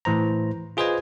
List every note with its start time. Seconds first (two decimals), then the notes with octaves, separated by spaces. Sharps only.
0.05 A2 E3 C5 A#5
0.77 F4 G#4 B4 C5 D#5 G#5